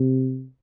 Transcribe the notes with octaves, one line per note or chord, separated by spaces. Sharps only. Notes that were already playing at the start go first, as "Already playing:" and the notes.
Already playing: C3